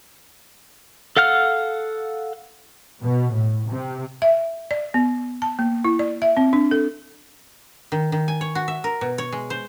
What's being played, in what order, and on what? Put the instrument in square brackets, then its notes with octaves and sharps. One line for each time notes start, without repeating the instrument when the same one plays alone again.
[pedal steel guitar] A4 F5 F#5 F6
[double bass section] B2
A2
C3
[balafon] E5
D5
B3
A5
A#3
E4
D5
E5
C4
D4
A4
[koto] D#3
D#3
G#5
C#5
F#4
E5
A#4
B2
C#5
G#3
C5